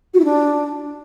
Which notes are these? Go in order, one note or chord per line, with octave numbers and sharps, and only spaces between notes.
F#4
E4
D4